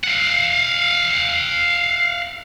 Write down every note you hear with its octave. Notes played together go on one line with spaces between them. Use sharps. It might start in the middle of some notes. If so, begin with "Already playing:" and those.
F5 F#5